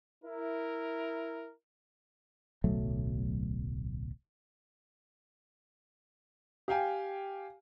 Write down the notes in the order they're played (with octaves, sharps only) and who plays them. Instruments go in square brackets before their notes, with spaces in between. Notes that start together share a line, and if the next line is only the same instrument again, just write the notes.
[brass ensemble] E4 A#4
[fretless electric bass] D1 B1 F#3 A3
[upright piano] G4 F5 G5 G#5